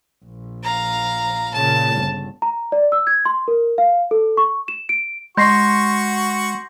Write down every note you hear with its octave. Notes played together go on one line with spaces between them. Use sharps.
A#1
F5 A#5
A#2 C#3 A5
G1
A#5
D5
E6
G#6
C6
A#4
F5
A4
C#6
E7
D7
G#3 F#4 C6 C#6 G6 A#6 C7